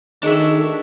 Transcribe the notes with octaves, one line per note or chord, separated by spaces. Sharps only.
D#3 G#3 D4 F#4 A4 E5